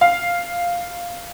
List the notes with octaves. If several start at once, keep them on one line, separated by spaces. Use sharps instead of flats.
F5